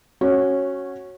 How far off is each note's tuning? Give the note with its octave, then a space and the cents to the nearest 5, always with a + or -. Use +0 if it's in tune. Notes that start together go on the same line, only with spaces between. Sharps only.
C#4 -10 F#4 +0